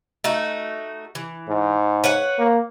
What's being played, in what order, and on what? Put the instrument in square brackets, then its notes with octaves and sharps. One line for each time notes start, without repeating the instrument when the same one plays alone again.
[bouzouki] A3 D#4 F#4
E3
[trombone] G#2
[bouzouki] B4 C#5 F#5
[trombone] A#3